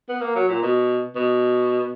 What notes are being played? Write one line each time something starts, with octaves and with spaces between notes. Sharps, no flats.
B3
A#3
F#3
A#2
B2
B2